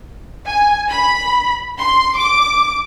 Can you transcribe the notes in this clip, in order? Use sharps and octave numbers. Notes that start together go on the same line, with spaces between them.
G#5
B5
C6
D6